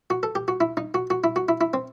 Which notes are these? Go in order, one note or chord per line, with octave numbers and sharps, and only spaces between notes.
F#4
A4
G4
F#4
E4
D#4
F#4
F#4
E4
F#4
E4
E4
C4